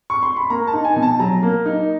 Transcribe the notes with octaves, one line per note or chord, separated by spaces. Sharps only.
C#6
C6
B5
A#3 A#5
A5
D#4
G#5
B2
A5
F#3 A#5
A#3
D#4